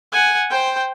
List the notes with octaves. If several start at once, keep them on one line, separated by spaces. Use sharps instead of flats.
F#5 G#5
C5 G5